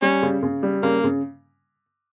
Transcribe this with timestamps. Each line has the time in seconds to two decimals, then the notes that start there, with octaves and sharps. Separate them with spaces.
0.02 G3 C#4
0.23 C#3
0.43 C#3
0.63 G3
0.83 C#3 A#3
1.04 C#3